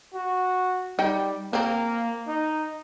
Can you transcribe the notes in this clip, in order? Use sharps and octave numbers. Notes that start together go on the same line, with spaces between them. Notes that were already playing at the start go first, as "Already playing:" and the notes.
F#4
G3 D#4 G5
F3 A#3 C4
D#4